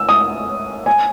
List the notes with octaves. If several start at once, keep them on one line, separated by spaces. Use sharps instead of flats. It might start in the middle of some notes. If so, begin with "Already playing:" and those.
Already playing: E6
D#6
G#5